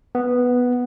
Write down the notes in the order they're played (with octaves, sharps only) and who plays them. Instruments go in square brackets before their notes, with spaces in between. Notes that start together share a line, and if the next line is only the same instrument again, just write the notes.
[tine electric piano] B3